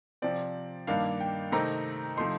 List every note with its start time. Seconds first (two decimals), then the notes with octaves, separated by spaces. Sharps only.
0.22 C3 F3 C4 D5
0.87 G2 D#3 A#3 D4 F5
1.21 G5
1.52 C3 D#3 A3 C4 D#4 A#5
2.17 C3 F3 A3 D#4 C6